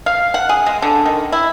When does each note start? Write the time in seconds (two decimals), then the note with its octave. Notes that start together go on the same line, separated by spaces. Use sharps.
0.06 F5
0.34 F#5
0.49 G#4
0.66 G#3
0.82 D3
1.06 D#3
1.32 E4